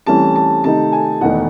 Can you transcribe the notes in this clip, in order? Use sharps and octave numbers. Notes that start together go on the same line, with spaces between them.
C2 C3 E3 A3 C#4 A5
A5
C3 D#3 A3 D#4 A5
G#5
E1 E2 D#3 A3 F#5